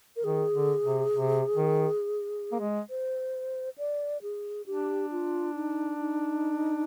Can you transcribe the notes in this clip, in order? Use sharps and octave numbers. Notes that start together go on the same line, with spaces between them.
A#4
D#3 G#4
D3
C3
C3
D#3
A#3
G#3
C5
D5
G#4
D4 G4
F4
D#4
D#4